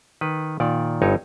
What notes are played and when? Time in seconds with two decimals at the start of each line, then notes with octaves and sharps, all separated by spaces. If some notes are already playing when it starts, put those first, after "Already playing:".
0.21 D#3 B4
0.60 A#2 D#3 D5
1.02 G1 G2 D#4 C#5